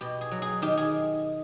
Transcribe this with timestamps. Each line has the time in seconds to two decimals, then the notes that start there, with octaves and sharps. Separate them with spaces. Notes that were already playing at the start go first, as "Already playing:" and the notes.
0.01 B2 G4
0.21 G#4
0.31 F#3
0.42 G#4
0.62 D#3 G4
0.77 G#4